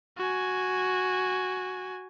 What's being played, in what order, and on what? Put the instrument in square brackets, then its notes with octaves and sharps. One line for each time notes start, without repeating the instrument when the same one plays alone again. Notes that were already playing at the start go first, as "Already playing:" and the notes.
[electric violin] F#4 G#5